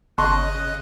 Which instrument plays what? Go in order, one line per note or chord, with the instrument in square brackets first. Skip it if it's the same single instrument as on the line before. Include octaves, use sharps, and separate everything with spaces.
[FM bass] G1 [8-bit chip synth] C#3 D#5 [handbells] A5 C6 C#6 [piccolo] F#6